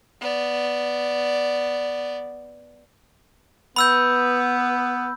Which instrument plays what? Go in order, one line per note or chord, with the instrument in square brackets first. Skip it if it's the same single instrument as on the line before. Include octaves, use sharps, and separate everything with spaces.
[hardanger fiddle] B3 D5
[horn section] B3 [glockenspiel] B5 E6 G6